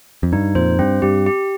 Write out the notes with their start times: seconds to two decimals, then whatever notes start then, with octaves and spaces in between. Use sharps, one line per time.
0.23 F2
0.33 G2 D#4
0.55 F2 A#2 C5
0.79 G2 C4
1.02 G2 G4
1.26 G4